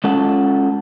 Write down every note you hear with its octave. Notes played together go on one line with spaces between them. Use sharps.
G#3 C#4 F4 A4 F#5 A5